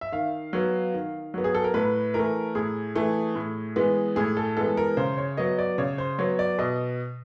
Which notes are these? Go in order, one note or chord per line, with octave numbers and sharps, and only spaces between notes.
E5
D#3 F5
F#3 B3
D#3
F#3 B3
G#4
A4
A#4
A2 B4
E3 A3 A#4
A2 G#4
E3 A3
A2
E3 G#3 B3
A2 G#4
A4
E3 G#3 B3 A4
A#4
C#3 C5
C#5
F#3 B3 D#5
D5
C#3 C#5
C5
F#3 B3 C#5
D5
B2 D#5